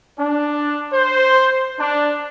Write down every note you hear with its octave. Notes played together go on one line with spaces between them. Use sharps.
D4
C5
D4